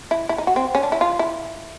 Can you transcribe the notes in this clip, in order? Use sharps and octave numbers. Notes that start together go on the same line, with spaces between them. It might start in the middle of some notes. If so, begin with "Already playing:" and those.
E4
E4
D#4
F#4
C4
C#4
D4
E4
F4
E4